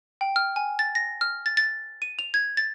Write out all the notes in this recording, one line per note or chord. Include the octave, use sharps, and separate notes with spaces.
G5
F6
G#5
A6
A#6
F6
A6
A6
D#7
F7
G#6
A6